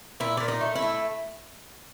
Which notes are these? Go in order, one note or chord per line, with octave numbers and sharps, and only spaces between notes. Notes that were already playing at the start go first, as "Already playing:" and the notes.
A#2 E4
A#2 D4
D#4
A3
E4
A3